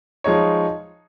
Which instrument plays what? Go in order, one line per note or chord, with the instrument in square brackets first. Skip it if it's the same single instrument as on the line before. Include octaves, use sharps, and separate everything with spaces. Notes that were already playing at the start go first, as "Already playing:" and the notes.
[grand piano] F3 G#3 D#4 C#5